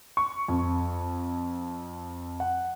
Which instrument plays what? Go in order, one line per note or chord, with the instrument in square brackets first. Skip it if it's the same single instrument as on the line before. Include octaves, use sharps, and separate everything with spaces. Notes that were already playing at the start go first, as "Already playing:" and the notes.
[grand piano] C#6
F2
F#5